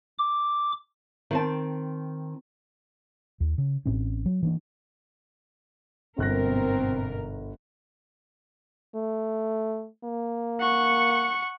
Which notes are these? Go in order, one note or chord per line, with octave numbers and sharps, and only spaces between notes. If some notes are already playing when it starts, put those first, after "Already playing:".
D6
D#3 C4 A5
D#2
C#3
A1 A2 C4 C#4
F#3
E3 A#3 D4
G1 G#2 B2 C4 A#4 F#6 A#6
A3
A#3
F#5 C#6